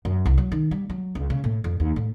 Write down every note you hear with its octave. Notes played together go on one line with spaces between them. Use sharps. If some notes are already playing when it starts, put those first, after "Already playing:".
F#2
C2
F#3
D#3
G3
F#3
C#2
C#3
A2
F2
D#2
A2